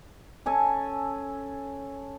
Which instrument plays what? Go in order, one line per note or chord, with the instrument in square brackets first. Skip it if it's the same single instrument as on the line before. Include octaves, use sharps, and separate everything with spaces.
[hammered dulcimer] C#4 A4 G#5 A5